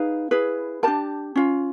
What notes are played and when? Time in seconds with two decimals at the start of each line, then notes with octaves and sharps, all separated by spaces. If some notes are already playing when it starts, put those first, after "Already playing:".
Already playing: D#4 G#4 B4 F5
0.31 E4 G#4 B4
0.83 D4 G4 A#4 A5
1.36 C#4 F4